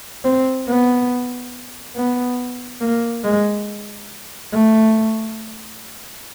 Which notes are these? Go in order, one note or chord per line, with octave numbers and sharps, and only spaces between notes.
C4
B3
B3
A#3
G#3
A3